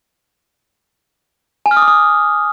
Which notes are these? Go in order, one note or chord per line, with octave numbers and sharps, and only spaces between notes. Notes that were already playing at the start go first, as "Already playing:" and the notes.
G#5
F6
D#6
D6
D#6